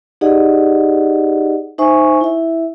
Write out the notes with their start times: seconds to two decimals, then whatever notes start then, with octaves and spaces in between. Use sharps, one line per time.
0.21 D#4 G4 G#4 D5 D#5 F#5
1.78 D#4 C5 E5 G#5 C#6
2.21 E4 E5